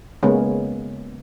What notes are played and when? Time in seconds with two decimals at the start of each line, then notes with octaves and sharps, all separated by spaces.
0.23 C#3 G#3 A#3 B3 C#4